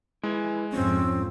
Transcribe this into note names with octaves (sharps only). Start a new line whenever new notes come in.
G#3 E4 B4 G#5
F2 G#2 F3 C4 C#4